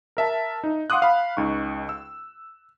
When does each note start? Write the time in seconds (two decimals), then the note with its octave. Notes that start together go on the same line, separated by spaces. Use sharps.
0.17 A#4 E5 A5
0.64 D#4
0.90 F5 F#5 C6 D6 D#6 F#6
1.02 F5 B5
1.37 C#2 D#4 C#6
1.89 E6